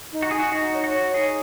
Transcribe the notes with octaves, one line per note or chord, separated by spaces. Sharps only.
D#4
F#4
G#4 G#5
F#4
D#4 F#4
C#5
F#4
C#5
D#4 G#4